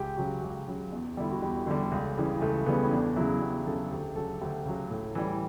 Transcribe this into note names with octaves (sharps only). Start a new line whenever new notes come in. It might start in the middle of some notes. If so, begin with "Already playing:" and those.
Already playing: C#2 G4
C#3 F#3 F#4
G4
C#2 G4
C#3 F#3
E2
D3 G3 E4
F#4
E2 G4
D3 G3
C#2
C#3 E3 G3
C#2 A3
C#3 E3 G3 B3
C#4
E2 D4
C#3 F#3 E4
E2 G4
C#3 F#3 A4
D2 G4
C#3 F#3 A4
D2 G4
C#3 F#3
A2
E3 G3